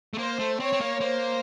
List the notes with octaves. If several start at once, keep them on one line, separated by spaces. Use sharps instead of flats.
A3
A#3 C5
A3
C4 C#5
C4
A#3
A#3 C5